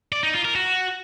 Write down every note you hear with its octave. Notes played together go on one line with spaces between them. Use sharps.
D5
D#4
F4
A#4
F#4